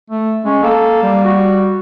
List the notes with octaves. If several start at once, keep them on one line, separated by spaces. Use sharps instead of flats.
A3
G#3 C#4
A#3 A4
G3
F#4